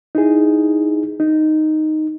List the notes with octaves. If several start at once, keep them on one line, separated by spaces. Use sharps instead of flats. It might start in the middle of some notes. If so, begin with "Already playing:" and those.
D#4 E4 G#4
D#4